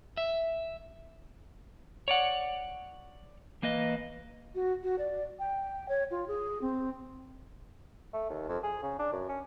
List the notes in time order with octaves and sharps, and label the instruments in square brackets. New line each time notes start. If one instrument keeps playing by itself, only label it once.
[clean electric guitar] E5
[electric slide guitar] C#5 D5 F#5
E3 A#3 B4 D#5
[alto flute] F#4
F#4
D5
G5
C#5
F4
G#4
C4
[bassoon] A3
D#2
F2
G#4
C#3
D4
F#2
C#4